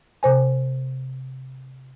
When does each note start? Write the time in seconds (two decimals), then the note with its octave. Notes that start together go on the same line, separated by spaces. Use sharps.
0.23 C3 C5 G#5